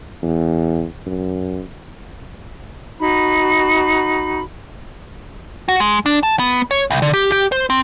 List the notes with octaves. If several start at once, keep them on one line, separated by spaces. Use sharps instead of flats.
E2
F#2
D#4 F#4 B5
F#4
G#3
D4
A5
B3
C#5
C2
D3
G4
G4
C5
C4